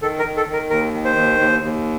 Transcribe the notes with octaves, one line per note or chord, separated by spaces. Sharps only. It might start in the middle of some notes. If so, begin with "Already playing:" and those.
D#3 A4
A#4
D#3
A4
D#3 A#4
D#2 A#4
D#3
C5
D#2
D#2
D#2